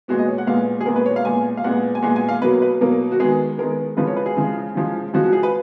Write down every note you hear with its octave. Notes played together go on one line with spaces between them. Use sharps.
A#2 G#3 B3 F#4
D#5
C#5
F#5
A#2 G#3 B3 F5
G#4
A#2 G#3 B3 A#4
B4
C#5
F5
A#2 G#3 B3 G#5
F5
A#2 G#3 B3 F#5
G#5
A#2 G#3 B3 F#5
G#5
F5
B2 F#3 A#3 B4
B4
B2 F#3 A#3 A#4
F#4
D#3 G#3 B3 G#4
D#3 G#3 B3 A#4
C#3 F3 G#3 B4
C#5
B4
G#4
C#3 F3 G#3
C#3 F3 G#3
C#3 F3 G#3 F#4
F#4
G#4
B4